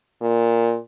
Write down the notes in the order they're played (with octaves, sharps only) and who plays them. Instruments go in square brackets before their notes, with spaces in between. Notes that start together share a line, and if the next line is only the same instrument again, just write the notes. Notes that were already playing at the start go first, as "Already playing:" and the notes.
[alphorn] A#2